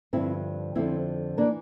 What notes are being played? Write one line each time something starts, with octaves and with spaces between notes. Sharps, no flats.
G2 D3 F3 C4 E4
F2 D3 F3 C4 E4
E3 A#3 D4